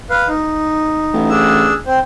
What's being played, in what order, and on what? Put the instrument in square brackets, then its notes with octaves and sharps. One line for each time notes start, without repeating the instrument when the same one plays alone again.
[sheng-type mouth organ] B4 F5
D#4
[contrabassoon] A1
[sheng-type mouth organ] D4 G#4 E6
C4 C5